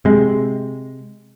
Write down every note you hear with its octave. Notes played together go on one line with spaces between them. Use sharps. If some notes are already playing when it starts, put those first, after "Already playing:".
C3 G#3